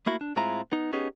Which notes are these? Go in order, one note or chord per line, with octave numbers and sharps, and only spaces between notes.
A3 A#3 E4 F#4
D4
A2 G#3 C4 E4 F4 A#5
B3 D#4
B3 C#4 D#4 G4 G#4